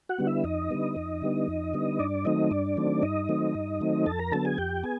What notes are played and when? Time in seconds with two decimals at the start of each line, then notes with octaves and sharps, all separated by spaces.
0.09 F#4 F#5
0.19 D3 G3 B3
0.27 E4 E5
0.44 F2 D#4 D#5
0.71 D3 G3 B3
0.96 F2
1.22 D3 G3 B3
1.48 F2
1.73 D3 G3 B3
1.99 G2 D4 D5
2.25 D#3 F#3 A3 C4 D#4 D#5
2.51 G2 D4 D5
2.77 D#3 F#3 A3 C4
3.03 G2 D#4 D#5
3.29 D#3 F#3 A3 C4
3.55 G2
3.80 D#3 F#3 A3 C4
4.06 F2 A4 A5
4.19 A#4 A#5
4.32 D3 F#3 B3 A4 A5
4.45 G#4 G#5
4.58 F2 G4 G5
4.83 B3 G#4 G#5